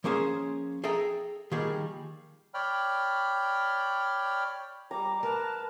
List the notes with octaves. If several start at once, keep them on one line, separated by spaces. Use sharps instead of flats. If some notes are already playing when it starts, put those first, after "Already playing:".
F3 A#3 C#4 G#4 C5
G#4 A4 E5 G5 A#5
D#3 F3 G3 A#3 G#4
C#5 D5 G5 B5 F6
G3 A#5 D6
A#4 B4 A5